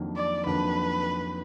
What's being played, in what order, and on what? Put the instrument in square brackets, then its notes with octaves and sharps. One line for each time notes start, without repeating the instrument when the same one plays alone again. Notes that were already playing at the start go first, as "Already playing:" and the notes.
Already playing: [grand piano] F2 D#3 F#3 A#3 D4
[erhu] D5
[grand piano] F2 D#3 F#3 A#3 D4 [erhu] B4